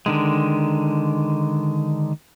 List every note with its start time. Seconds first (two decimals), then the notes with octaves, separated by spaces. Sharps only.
0.06 D3 D#3 G#3